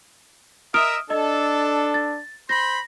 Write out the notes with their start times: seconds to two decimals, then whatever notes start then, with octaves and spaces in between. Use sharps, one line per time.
0.74 A#4 D#5 E5 D#6 F6 D7
1.10 D4 A4 D#5
1.94 A6
2.49 C5 B5 C6 A#6